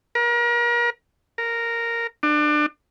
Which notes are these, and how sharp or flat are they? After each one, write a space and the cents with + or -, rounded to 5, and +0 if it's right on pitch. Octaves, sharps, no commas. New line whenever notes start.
A#4 +35
A#4 -5
D4 +30